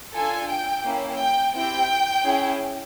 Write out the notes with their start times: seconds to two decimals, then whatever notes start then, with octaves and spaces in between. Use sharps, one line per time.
0.14 D4 F4 A4 G#5
0.49 G5
0.85 A#3 C#4 E4
1.19 G5
1.54 C4 E4 G4 G5
2.24 C#4 E4 G#4